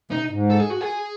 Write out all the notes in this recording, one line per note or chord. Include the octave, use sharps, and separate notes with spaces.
C3 D#4
G#2
A4
G#4
F#4
G#4